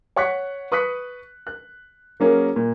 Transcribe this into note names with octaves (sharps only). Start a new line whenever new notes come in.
C#5 F#5 C#6 F#6 B6
B4 C#6 D#6 F#6 B6
F#6
F#3 A#3 C#4 G#4 A#4
A#2